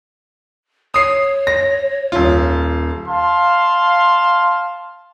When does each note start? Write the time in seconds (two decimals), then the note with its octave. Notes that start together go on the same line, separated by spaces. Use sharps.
0.94 C#5 D#6 C7
1.47 A#6
2.12 D#1 F4
3.08 F5 A5 C6